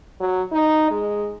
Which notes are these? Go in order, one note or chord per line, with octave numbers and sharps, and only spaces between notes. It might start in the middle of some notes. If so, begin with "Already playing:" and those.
F#3
D#4
G#3